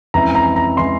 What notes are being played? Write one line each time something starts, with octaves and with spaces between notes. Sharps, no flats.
F2 E3 G#3 C#4 E4 A#5
A#5
A#5
E3 G#3 C#4 E4 C6